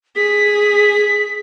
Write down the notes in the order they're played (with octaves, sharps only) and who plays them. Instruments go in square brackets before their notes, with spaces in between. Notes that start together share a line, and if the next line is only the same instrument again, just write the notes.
[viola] G#4 [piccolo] B6